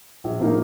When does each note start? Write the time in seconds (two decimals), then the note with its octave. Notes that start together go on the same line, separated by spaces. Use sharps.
0.24 A#1
0.40 A2 F3 A#3 D#4